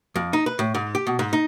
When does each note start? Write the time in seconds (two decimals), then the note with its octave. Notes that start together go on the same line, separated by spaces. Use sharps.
0.16 F2
0.33 D#4
0.46 B4
0.59 A2
0.75 G#2
0.95 G4
1.07 B2
1.19 G#2
1.33 D#4